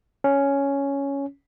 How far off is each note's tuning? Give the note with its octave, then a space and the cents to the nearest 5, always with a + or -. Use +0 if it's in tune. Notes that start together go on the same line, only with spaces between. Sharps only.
C#4 +5